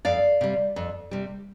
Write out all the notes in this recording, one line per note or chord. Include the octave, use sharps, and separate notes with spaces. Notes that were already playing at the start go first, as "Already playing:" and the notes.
F2 D5 F5
C3 G3
F2
C3 G3